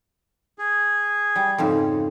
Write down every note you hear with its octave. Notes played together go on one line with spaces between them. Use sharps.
G#4
G3
F2 G#2 C#3